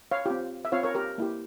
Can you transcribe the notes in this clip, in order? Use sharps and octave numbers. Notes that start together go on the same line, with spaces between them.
C#5 F5
C4 F4 G4
E5
C4 F4 C#5 F5
A#4 C#5
G4 A#4
A#3 E4 G4